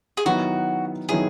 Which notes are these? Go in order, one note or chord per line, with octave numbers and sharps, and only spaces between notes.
G#4
D#3 F#3 B3 E4 F#4
D#3 F#3 B3 E4 G#4